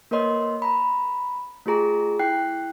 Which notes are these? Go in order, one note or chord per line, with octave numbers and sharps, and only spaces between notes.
A#3 A#4 B4 C#5 D#5 C6
A#5 B5
A3 F4 G4 G#4 A#5
E4 G5 F#6 C7